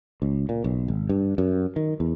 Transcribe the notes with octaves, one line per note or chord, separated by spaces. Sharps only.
C#2
A#2
B1
G#1
G2
F#2
D#3
E2